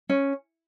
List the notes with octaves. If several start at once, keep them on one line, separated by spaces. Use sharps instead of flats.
C#4